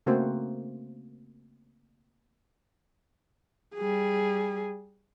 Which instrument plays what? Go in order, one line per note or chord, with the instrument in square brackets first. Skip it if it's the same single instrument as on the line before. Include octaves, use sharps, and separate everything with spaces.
[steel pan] C#3 A3 A#3 C4 F#4 C5
[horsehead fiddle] G3 G#4